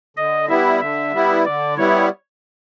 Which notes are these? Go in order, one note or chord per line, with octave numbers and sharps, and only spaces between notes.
D3 D#5
G3 B3 E4 E5
D3 E5
G3 B3 E4
D3 D5
G3 B3 E4 C#5